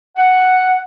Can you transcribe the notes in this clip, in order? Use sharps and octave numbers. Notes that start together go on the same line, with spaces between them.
F#5